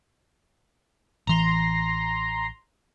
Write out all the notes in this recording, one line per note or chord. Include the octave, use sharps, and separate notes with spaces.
A1 E3 A#5 C6